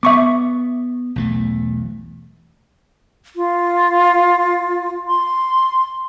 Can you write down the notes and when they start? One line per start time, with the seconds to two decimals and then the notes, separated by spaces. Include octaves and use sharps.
0.03 B3 E5 C#6 D6
1.16 B1 E2 A3
3.36 F4
5.07 C6